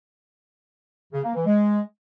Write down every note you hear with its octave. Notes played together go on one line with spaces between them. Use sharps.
C#3
A#3
E3
G#3